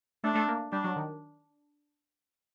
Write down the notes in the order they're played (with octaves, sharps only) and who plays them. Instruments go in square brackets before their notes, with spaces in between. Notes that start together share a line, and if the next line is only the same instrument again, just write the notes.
[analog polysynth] A3 [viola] D4
[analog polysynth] A3
A#3
[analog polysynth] G3 [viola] D4
[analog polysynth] F#3
D#3